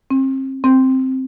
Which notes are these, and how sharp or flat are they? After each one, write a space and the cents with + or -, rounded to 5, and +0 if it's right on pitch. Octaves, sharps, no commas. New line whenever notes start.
C4 +35
C4 +5